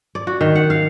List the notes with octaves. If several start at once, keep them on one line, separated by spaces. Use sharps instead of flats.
D5
F#4
D#3
F#5
F5